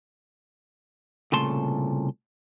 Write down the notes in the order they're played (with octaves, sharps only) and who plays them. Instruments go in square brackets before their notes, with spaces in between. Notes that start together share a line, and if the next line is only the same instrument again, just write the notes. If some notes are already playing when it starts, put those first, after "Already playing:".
[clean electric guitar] C2 A#2 C#3 A3 A5 C6